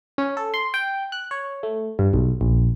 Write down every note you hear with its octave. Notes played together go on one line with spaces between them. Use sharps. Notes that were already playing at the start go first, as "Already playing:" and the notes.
C#4
A4
C6
G5
F#6
C#5
A3
G2
B1
A#1